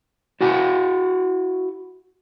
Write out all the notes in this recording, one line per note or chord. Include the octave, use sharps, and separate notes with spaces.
E4 F#4 F#5 G#5